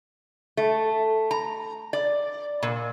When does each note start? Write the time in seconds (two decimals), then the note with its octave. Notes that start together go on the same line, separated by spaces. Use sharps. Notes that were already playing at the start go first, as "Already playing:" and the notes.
0.57 A3
1.31 A#5
1.93 D5
2.63 A#2